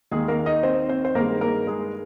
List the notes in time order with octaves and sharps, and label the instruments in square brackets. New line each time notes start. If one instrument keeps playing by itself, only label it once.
[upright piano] D#2 D#3 G#3 A#3 G#4
A#3 A#4
D#4 D#5
C4 C5
C4 C5
C5
G2 D#3 G#3 A#3 A#4
A#3 A#4
G#3 G#4